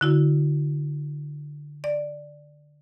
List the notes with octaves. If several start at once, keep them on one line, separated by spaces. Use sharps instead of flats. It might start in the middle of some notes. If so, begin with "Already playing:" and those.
D3 E4 F#4
D5